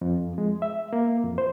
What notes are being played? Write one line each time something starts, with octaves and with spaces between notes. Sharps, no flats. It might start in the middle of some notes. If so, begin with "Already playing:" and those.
F2
G#3
E5
A#3
F2
C5